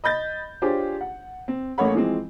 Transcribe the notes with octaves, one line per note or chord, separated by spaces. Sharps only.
D#5 B5 G6 A6
D4 F4 G4 G#4 C5 C#5
F#5
C4
A1 A3 A#3 C#5 F#5 B5
E3 F3 G#3 C4